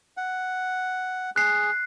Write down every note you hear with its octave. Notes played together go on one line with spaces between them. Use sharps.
F#5
G#4 F#6 C7